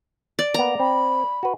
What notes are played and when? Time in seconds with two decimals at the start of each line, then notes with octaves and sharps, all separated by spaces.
0.39 D5
0.54 A#3 B3 A#5
0.80 C4 B5
1.43 F#4 B4